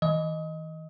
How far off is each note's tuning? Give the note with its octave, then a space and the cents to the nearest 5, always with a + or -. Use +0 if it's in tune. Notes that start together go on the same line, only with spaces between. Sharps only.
E3 -40 D#5 +0 D#6 +35